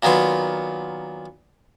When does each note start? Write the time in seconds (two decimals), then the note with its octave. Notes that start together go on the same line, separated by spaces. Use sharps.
0.03 A#2 D#3 F#3 B3 C6